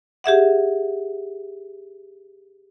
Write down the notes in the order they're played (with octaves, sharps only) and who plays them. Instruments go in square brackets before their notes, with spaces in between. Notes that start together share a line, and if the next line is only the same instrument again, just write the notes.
[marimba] G4 G#4 E5 F#5